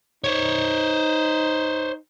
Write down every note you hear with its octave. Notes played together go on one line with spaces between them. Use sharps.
D#4 C5 C#5